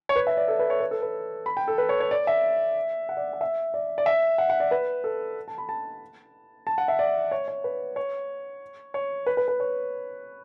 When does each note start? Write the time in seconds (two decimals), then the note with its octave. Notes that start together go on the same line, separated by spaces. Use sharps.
0.09 C#5
0.16 B4
0.27 E5
0.37 D5
0.48 A4
0.59 B4
0.70 C#5
0.80 B4
0.91 A4
1.02 B4
1.46 B5
1.57 G5
1.68 A4
1.78 B4
1.89 C#5
2.00 C#5
2.11 D5
2.27 E5
3.09 F#5
3.17 D5
3.33 F#5
3.41 E5
3.74 D5
3.98 D5
4.06 E5
4.38 F#5
4.50 F#5
4.60 D5
4.71 B4
5.04 A4
5.48 A5
5.58 B5
5.69 A5
6.67 A5
6.78 F#5
6.88 E5
6.99 D5
7.31 C#5
7.48 C#5
7.64 B4
7.96 C#5
8.94 C#5
9.27 B4
9.37 B4
9.48 B4
9.60 C#5